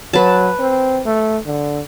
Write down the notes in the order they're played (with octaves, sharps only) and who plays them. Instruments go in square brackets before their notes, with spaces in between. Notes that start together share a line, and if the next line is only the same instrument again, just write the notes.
[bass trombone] F#3 [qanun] B4 A5
[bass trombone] C4
A3
D3